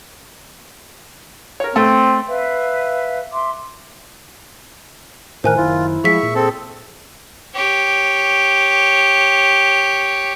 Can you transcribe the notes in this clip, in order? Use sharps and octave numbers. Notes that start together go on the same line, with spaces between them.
A#4 C#5
A3 C4
B4 E5 F5
E5 C6 D6
A2 D#3 A#4 C5 G#5 F#6
F#1 D#3 E4 F4
F3 G#3 G#4 E5 C#6 B6
A#2
C4 G#4 A4
G4 C#5